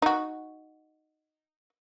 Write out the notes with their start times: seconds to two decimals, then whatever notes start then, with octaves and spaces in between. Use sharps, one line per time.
0.02 D#4 F#4